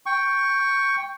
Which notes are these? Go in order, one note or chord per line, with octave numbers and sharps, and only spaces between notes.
G5 C#6